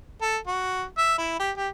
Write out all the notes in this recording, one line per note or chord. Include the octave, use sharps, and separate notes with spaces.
A4
F#4
E5
E4
G4
G4